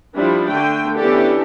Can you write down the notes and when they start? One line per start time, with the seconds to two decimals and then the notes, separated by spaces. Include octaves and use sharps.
0.14 F3 G3 D4 E4
0.49 D3 A3 G5
0.97 E3 B3 C#4 D4 G4 A4